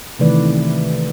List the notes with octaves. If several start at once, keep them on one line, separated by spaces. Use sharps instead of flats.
C3 D#3 E3 A3 B4 D5